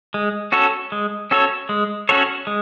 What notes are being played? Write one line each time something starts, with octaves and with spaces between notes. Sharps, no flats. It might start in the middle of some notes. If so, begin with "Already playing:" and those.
G#3
C#4 F#4 A4 C#5
G#3
C#4 F#4 A4 C#5
G#3
C#4 F#4 A4 C#5
G#3